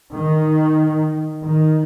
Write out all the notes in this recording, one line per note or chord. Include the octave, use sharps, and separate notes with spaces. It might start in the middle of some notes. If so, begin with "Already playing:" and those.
D#3
D#3